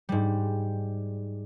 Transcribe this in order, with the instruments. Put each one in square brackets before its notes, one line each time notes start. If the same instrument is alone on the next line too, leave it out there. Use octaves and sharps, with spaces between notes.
[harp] G#2 G3